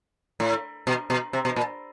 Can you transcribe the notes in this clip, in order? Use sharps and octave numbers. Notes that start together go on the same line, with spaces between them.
A2
B2
B2
C3
B2
A#2